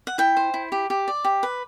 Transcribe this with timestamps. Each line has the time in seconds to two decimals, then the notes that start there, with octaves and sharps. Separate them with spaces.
0.07 F#5
0.18 E4 G5
0.37 C5
0.54 E4
0.72 G4
0.90 G4
1.08 D5
1.24 G4
1.43 B4